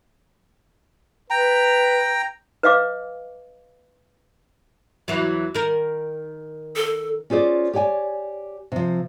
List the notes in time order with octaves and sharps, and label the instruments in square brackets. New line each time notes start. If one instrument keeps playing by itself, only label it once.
[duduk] B4 [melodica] G5 A#5
[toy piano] B4 D#5 F5 D6
[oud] E2 E3 F#3
D#3 A#4
[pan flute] A4
[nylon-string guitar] C#4 F4 G#4 C5 D5
G4 C#5 D5 G5 G#5
C3 F3